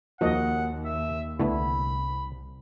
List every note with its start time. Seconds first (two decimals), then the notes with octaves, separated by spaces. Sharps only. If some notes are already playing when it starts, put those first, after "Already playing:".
0.21 D#2 F3 A#3 D#4 F#4 D#5 F#5
0.85 E5
1.40 C2 D3 A3 B3 E4 B5